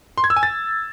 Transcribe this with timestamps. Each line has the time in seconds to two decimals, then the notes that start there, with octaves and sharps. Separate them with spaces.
0.18 C6
0.24 G#6
0.30 E6
0.37 G#5
0.43 A6